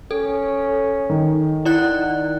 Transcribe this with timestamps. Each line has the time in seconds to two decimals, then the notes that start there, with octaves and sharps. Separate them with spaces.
0.11 C#4 A4
1.10 D#3
1.65 E4 D5 F#5 F#6